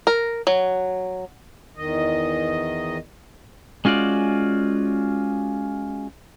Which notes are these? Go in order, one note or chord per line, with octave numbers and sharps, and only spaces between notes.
A#4
F#3
E2 D#3 D#5
G#3 C#4 F4 F#4 D5